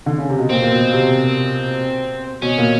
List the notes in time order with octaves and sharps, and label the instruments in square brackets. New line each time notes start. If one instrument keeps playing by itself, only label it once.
[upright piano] D3
C#3
C3
B2
[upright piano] A#2 [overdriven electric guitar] C4
[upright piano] A#2
B2
C3
[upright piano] B2 [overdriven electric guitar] C#4
[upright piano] A#2